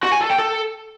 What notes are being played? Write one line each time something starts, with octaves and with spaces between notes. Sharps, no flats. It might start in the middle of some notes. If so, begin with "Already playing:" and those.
F#4
G#5
A4
G5
A4